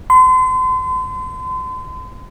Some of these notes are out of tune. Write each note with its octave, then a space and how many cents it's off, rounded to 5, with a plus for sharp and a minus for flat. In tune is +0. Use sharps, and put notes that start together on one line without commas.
C6 -40